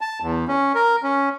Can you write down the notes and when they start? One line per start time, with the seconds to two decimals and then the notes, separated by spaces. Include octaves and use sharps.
0.01 A5
0.22 E2
0.48 C#4
0.75 A#4
1.03 C#4